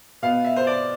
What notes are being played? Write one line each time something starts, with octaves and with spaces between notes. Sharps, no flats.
B2 B3 F5
E5
C5
D5